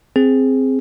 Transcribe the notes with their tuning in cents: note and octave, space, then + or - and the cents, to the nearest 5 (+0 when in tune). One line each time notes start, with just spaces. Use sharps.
C4 +0 G#4 +0